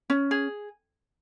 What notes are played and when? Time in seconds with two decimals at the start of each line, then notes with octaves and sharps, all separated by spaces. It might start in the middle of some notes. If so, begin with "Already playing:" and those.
0.10 C#4
0.31 G#4